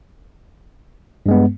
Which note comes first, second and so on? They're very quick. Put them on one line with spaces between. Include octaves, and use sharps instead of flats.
G2 G#3 B3